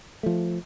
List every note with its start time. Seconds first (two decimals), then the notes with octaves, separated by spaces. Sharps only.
0.23 F3 A3